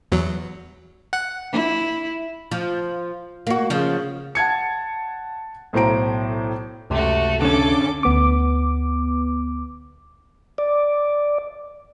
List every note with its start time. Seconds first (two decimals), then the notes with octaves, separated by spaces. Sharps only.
0.12 E2 F#3
1.13 F#5
1.52 E4
2.51 F3
3.47 A#3 F#4
3.70 C#3 F3
4.35 F#5 A5 G#6 C#7
5.73 B1 A2 C5 A#5 D7
6.90 C#2 F#2 C3 A3 F#4
7.42 D3 C#4 A4 D6
8.03 D2 B3 D6
10.58 D5